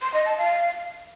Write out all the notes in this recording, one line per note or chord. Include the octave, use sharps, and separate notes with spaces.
C6
D#5
A5
F5